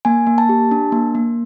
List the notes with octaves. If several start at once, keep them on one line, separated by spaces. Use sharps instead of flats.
A#3 G#5
A#3
A5
G4
D4
A#3
A#3